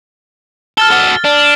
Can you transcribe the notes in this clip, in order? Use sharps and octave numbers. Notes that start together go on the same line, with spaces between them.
A4 F6 A6 G7
F#4 A4
D4